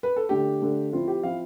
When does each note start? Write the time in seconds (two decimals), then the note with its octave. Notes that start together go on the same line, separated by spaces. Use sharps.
0.03 B4
0.16 A4
0.29 D3 A3 D4 G4
0.61 D3 A3 D4
0.92 F3 C4 E4 F4
1.08 G4
1.23 F3 C4 E4 F5